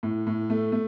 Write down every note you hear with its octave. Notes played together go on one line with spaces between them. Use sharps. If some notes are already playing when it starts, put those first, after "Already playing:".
A2
A2
A3
A3